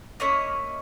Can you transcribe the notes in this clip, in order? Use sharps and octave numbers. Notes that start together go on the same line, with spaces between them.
A#3 C#4 E4 C#5 D#5